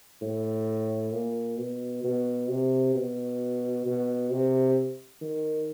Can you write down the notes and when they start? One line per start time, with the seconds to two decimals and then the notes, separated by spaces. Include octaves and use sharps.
0.22 A2
1.13 A#2
1.57 B2
2.04 B2
2.49 C3
2.95 B2
3.86 B2
4.31 C3
5.21 D#3